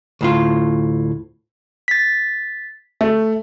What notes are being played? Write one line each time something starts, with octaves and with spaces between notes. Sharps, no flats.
D2 A2 F4
A6 B6
A3